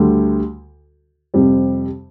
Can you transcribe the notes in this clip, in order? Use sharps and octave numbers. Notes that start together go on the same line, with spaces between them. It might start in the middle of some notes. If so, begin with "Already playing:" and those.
Already playing: D2 D3 G3
F2 C3 G3 C4